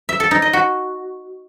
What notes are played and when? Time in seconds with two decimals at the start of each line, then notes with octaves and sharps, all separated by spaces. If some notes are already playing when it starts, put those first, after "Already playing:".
0.09 E5
0.20 A4
0.31 D#4
0.42 D#5
0.53 F#4